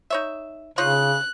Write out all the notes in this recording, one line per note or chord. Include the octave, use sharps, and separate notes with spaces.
D#4 C#5 E5
C#3 D#4 F4 C#5 F#6